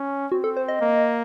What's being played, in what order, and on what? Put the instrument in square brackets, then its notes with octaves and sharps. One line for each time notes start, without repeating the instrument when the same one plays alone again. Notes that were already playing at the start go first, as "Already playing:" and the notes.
Already playing: [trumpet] C#4
[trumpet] C4 [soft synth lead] F#4
[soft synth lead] A4
C5
D#5
[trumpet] A#3